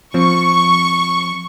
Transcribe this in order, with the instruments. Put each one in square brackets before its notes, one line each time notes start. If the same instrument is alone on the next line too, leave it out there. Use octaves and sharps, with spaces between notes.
[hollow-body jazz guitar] F3 C4 [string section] C#6